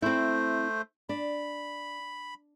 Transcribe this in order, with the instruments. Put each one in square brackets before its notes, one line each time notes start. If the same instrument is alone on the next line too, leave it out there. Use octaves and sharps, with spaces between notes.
[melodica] A3 C5 [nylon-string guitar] C4 E4
[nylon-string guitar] D4 [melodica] B5